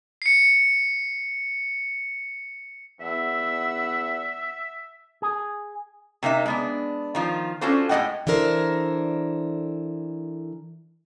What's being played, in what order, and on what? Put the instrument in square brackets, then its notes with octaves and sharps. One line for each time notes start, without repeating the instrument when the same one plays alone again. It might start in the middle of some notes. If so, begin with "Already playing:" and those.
[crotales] C7 C#7
[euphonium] E2 [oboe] E5 [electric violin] F#5 E6
[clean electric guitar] G#4
[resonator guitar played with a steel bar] C3 A#3 D#4 E5
G#3 B3 D4
D#3 F3 F4
C#4 D4 F4 F#4 A4 C5
A2 G#3 B3 D#5 F#5 G5
[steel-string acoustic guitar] E3 D4 A4 A#4 C5